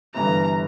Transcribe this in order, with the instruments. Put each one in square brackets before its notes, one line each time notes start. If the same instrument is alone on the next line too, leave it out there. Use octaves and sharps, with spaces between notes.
[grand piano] G1 G2 E3 [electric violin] A#5